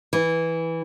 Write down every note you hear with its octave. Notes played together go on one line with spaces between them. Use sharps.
E3